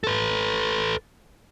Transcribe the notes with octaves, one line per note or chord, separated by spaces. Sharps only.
A4 B4